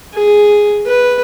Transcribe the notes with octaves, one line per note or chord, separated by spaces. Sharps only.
G#4
B4